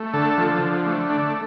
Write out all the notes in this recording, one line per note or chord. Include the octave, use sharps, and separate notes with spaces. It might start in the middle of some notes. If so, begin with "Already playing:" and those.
Already playing: A3
D3 A4
F3
D3
A3
D4